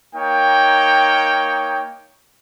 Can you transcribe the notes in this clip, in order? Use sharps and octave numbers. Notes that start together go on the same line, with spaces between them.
A#3 D#4 C#5 G5